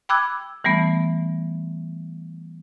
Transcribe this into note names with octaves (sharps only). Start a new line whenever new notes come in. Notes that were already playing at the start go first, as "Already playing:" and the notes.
G5 B5 D6 E6 F#6 G#6
E3 G3 A3 B3